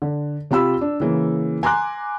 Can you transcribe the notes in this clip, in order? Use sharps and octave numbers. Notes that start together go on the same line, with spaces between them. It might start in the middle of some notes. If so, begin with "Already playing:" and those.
D3
C3 F4 G4 B5 E6
D4
C#3 E3 A#3
G#5 A#5 C6 D6 F#6